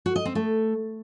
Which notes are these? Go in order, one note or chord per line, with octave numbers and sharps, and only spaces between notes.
F#4
D#5
C4
A3